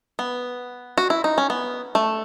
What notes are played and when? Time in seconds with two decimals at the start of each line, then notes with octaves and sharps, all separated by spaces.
0.19 B3
0.98 F#4
1.10 E4
1.24 D#4
1.38 C#4
1.50 B3
1.95 A3